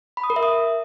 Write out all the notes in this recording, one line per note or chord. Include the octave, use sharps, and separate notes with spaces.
B5
D#6
A#4
E5
D#6